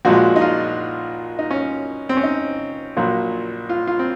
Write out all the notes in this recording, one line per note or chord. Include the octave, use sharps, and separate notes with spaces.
A#1 A#2 F3 G#3 F#4
D#4
F4
D#4
C#4
C4
C#4
D#4
A#1 A#2 F#3
F4
F4
C4